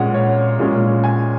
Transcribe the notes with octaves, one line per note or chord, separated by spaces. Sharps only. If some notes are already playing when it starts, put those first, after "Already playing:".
Already playing: A#2 G#3 C#4 F#5
C#5
A#2 G#3 C#4
G#5